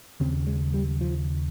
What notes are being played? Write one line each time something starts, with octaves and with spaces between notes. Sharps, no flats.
D#2 C#3 C4
G#3
G3
F3